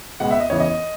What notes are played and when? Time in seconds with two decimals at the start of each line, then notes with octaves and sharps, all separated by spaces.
0.20 C#2 B2 G#3 B3 F#5
0.31 E5
0.40 D#5
0.50 E2 C#3 E3 C#5
0.60 D#5